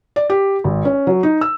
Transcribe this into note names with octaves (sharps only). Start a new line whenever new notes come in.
D5
G4
G#1
C#4
F#3
D#4
E6